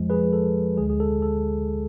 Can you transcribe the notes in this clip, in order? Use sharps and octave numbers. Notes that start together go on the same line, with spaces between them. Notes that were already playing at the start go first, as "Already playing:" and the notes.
Already playing: F2 F3 G#3
G#4 B4
A4
D2 D3 G#3 G#4
G#4
A4
A4